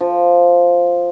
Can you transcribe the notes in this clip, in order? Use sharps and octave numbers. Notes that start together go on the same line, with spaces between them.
F3